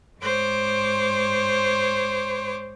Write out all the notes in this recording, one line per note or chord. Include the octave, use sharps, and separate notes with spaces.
G#2 C5 C#5 D6